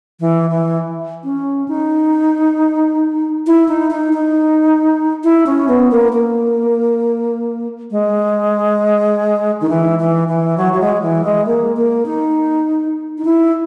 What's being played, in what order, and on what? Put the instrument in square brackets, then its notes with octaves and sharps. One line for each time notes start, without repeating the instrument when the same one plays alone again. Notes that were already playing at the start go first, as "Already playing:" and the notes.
[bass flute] E3
E3
C#4
D#4
E4
D#4
D#4
D#4
E4
C#4
B3
A#3
A#3
G#3
D#3
E3
E3
E3
F#3
F#3
G#3
E3
G#3
A#3
A#3
D#4
D#4
E4